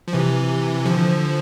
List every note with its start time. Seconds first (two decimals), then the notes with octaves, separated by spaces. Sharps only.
0.08 F3
0.13 C3 E3
0.86 D3 F3